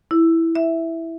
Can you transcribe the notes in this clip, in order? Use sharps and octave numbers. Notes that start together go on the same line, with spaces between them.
E4
E5